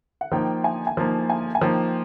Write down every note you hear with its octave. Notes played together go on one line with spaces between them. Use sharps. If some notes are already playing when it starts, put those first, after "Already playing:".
F#5
F3 A#3 D#4 G5
G#5
G#5
F3 A#3 D#4 A5
G#5
G#5
F3 A#3 D#4 G5